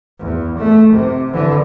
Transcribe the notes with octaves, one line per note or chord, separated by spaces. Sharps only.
E2
A3
C3
D3 E3